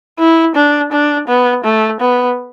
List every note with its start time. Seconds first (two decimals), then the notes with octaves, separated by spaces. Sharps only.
0.19 E4
0.55 D4
0.92 D4
1.28 B3
1.64 A3
2.00 B3